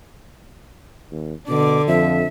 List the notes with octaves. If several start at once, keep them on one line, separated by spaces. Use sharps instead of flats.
D#2
B2 D3 D6
F2 F3 E5